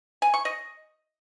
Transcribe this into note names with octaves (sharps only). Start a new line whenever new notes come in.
G#5
C#6
D#5